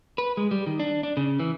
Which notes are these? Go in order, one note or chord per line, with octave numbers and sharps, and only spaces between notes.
B4
G#3
G3
D#3
D4
D4
C#3
E3